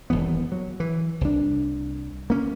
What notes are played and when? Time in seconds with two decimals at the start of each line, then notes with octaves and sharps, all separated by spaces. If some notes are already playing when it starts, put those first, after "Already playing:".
0.10 D#1 D#2 E3 B3
0.52 F#3
0.80 E3
1.21 C2 D4
2.30 A#3 C#4